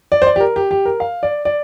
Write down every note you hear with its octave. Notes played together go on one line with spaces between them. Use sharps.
D5
C5
D5
G4
A#4
G4
G4
A#4
F5
D5
D5